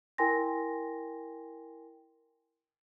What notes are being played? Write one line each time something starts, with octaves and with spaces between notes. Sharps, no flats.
E4 A#4 G5 G#5 C6 A#6